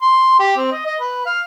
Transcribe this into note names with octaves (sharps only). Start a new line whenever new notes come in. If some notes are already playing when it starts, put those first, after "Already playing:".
C6
G4
C4
D#5
D#5
B4
F5